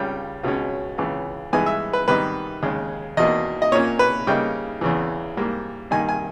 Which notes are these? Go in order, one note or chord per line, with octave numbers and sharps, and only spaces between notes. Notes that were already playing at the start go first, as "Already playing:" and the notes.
Already playing: C#2 C#3 G3 G5
C#2 B2 G#3 C#4
C#2 C#3 E3
G2 E3 G#3 B3 D#4 G#5
E5
B4
G#2 D#3 G3 B3 D#4 B4
D#2 C#3 G#3
E2 B2 A#3 D#4 D#5
D#5
A#2 A#3 C#4 C#5
B4
C#3 G3 A#3 D#4 G5
E2 C#3 E3
G#2 G3 A#3
G2 D#3 A#3 D#4 G#5
G#5